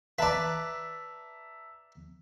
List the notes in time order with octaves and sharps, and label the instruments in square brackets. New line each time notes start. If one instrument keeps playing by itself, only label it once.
[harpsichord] B4 D5 [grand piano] E5 A5 A#5